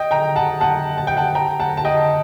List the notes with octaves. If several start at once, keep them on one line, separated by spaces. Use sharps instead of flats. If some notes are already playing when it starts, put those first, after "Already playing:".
Already playing: D#5 G5
G5 A#5
F#5 A5
F#5 A5
A5
G5
F#5 A5
G5 A#5
F#5 A5
A5
D#5 G5